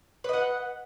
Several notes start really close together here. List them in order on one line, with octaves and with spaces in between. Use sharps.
B4 D#5 F#5